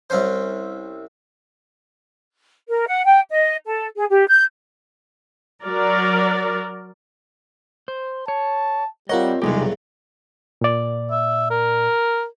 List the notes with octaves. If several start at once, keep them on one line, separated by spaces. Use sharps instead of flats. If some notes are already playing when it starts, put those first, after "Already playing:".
C2 C4 C#4 C5
A#4
F#5
G5
D#5
A4
G#4
G4
G6
F#3 A#4 D5
C5
C#5 A5
G3 C4 F4 A#4 C#5 D#5 F#5
B1 E2 G2 C3 G#3 D#4 G4
A#2 D5
E5
A#4